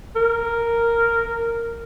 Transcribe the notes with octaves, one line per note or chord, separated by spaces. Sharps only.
A#4